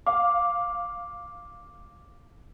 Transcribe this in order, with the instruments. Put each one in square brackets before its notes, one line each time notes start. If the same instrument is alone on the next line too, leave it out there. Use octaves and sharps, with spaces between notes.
[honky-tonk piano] F5 [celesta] D6